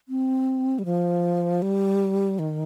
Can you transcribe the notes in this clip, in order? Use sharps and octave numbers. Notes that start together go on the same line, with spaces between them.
C4
G3
F3
G3
D#3